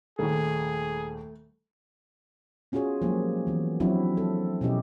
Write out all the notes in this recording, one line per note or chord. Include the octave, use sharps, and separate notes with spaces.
D#1 D#2 A3 G#4
B3 C#4 F4 F#4 G#4 C#5
F3 F#3 G#3 A#3 G4
E3 B3
F3 F#3 C4 D4 E4 F#4
A4
B2 C#4 E4 G4 D#5